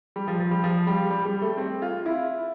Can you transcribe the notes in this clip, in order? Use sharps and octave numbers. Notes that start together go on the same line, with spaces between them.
G3
F3
F3
G3
F3
G3
G3
G3
A3
C4
F4
E4